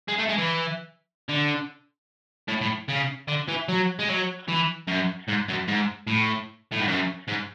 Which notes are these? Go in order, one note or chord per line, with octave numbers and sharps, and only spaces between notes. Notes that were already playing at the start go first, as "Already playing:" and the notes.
G#3
A3
G#3
E3
D3
A2
A2
C#3
D3
E3
F#3
G#3
F#3
E3
F#2
G#2
F#2
G#2
A2
A2
G#2
F#2
G#2